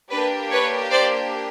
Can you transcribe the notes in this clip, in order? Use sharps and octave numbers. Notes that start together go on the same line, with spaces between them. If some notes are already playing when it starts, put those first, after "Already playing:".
A#3 D4 G4 B4
B4 C#5
C5 D5